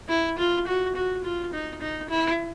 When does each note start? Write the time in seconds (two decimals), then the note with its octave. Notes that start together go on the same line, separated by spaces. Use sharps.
0.09 E4
0.38 F4
0.66 F#4
0.95 F#4
1.24 F4
1.53 D#4
1.81 D#4
2.09 E4